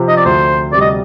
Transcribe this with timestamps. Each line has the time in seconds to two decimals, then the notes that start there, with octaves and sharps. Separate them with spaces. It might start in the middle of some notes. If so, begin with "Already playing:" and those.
Already playing: C3 F3 C4 G4
0.08 D#5
0.17 D5
0.25 D2 C5
0.72 C3 G3 D5
0.81 D#5